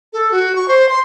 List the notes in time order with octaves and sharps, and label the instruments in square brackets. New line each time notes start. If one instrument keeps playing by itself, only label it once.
[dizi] A4
F#4
C#6
C5
C6